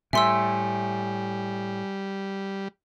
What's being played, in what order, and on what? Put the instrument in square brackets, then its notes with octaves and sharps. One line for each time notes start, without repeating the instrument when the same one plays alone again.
[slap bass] A2 [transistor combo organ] G3 [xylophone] E5 C6 E6 [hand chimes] G#5